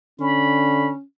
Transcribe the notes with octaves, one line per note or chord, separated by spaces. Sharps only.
D3 C#4 B5